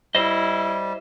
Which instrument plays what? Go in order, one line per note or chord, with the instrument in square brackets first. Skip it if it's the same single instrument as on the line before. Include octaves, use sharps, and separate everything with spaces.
[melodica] G3 [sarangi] E4 [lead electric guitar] C5 D#5